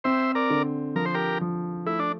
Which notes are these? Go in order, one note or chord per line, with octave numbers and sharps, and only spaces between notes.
C4 C5 E5
A#4 D5
D3
F3 A#4
C5
G4 A#4
F3
A3 E4
D4